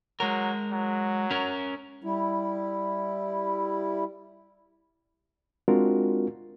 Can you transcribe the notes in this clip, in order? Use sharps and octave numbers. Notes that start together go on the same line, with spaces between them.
F#3 G#3 A#4
F#3
C#4 A#4
G3 E4
G#3 C4 D4 F4 F#4 A#4